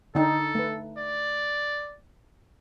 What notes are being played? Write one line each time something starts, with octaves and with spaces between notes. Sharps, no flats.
D3 D#4 A4
A3 B4
D5